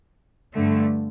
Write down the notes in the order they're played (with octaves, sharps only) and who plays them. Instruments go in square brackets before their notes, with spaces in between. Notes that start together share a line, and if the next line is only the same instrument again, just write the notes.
[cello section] G2 D3 A3